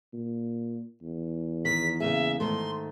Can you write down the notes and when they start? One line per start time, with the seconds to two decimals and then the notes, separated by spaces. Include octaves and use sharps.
0.13 A#2
1.02 E2
1.65 D#3 B6
2.00 C#3 A#3 G#4 E5
2.40 G#2 D#3 A3 C6